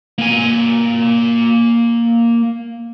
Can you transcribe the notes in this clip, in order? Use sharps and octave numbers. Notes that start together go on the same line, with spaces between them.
A#3 G#5